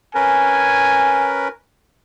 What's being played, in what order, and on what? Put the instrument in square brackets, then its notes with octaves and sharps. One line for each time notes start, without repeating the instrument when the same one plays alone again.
[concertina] C#4 A#4 B4 [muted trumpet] G#5